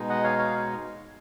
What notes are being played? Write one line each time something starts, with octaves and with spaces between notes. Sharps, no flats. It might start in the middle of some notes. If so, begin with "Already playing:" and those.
Already playing: B2 G#3 D#4
D#5 F#5
C#5 F5
C#5 F5